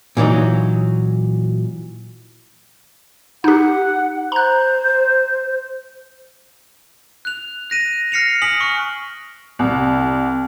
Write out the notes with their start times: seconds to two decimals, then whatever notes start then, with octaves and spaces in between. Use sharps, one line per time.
0.17 A#2 E3 F#3 D#4
3.44 D#4 G4 F#5
4.32 C5 A#5 F#6
7.25 F#6 F7
7.70 F#6 A#6 D#7
8.12 F6 A#6 C7 C#7 E7 F7
8.42 G#5 D#6 B6 D7 F#7
8.61 C#6 F6 B6
9.59 C2